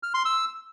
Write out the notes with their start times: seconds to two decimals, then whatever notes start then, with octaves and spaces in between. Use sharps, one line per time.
0.03 F6
0.14 C6
0.25 E6